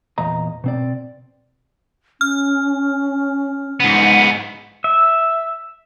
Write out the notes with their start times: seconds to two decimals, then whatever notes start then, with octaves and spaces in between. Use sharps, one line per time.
0.18 E2 A#2 D#5 A#5
0.64 B2 C4 D5
2.21 C#4 F6
3.80 G#2 B3
4.84 E5